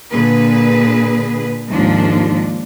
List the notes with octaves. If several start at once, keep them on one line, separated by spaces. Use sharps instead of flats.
A#2 D3 G#4 B4
D#2 G#2 F3 D4